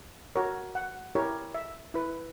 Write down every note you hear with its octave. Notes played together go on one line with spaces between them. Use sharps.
F#4 A#4 C#5
F#5
E4 G4 A#4 C#5
E5
E4 B4